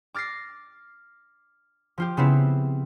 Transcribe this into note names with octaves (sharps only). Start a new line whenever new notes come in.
D6 F6 A6 A#6 C7
F3 F4 G4
C#3 B3 C4 E4